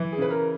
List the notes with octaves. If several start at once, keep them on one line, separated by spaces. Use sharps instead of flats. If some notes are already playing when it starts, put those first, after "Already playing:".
Already playing: E3
G#4
C#3 B4
A#4